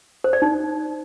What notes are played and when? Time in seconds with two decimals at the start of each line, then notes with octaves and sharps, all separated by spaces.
0.24 C5
0.33 D5
0.42 D#4